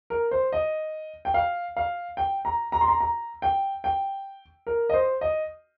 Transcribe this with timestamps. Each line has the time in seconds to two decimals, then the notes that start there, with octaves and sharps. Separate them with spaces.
0.10 A#4
0.31 C5
0.52 D#5
1.25 G5
1.34 F5
1.77 F5
2.17 G5
2.45 A#5
2.72 A#5
2.81 C6
2.88 A#5
3.00 A#5
3.42 G5
3.84 G5
4.67 A#4
4.90 D#5
4.94 C5
5.21 D#5